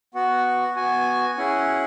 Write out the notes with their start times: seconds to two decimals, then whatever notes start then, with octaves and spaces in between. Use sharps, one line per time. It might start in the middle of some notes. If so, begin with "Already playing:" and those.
0.14 B3 F#4 F#5
0.76 B3 F#4 G#5
1.38 C#4 E4 G#4 F#5